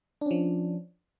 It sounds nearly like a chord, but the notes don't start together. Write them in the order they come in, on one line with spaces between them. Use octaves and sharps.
D4 C#4 F3